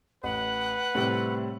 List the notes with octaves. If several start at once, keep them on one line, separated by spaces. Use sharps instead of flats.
A1 B4 F#5
A2 C3 G3 C4